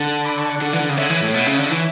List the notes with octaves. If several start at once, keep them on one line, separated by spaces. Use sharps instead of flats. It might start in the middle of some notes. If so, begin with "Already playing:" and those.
Already playing: D3 F#5 A5
B5 D6
A5 C#6
D5 F#5
D3
E3
D3
C#3
D3 C#5 E5
E3
A2
B2
C#3
D3
E3